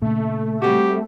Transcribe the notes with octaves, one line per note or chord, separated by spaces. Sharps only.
A#2 C#3 A3
G3 C4 F#4 G4